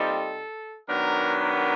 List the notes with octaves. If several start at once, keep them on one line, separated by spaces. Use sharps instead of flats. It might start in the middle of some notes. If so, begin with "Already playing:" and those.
Already playing: A#2 G3 C4 D#4 A4
D#3 F#3 B3 D4 A#4
A#4